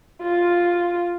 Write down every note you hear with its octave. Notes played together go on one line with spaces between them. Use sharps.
F4